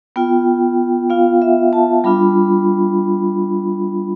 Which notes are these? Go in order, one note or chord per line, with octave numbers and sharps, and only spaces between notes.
B3 F4 G5
B3 F4 F5
E5
A5
G3 D4 F4 B5